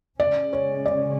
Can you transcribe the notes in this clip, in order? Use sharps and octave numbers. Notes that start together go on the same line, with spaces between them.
C#3 G#3 C#4 D5
C#5
D5